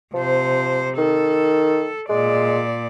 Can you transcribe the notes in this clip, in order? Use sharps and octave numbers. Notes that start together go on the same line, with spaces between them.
C3 F3 C5
D#3 A4
A#2 G#3 D5